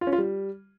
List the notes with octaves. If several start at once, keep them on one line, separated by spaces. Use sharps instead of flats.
F4
C#4
F4
G3